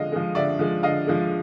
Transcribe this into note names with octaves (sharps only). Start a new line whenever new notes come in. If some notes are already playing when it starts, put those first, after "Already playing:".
Already playing: D3 F3 G#3 D#5 F5
F3 G#3
D3 D5 E5
F3 G#3
D3 D#5 F5
F3 G#3